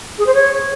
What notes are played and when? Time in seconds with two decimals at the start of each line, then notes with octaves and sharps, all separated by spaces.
0.18 G#4
0.26 C5
0.34 C#5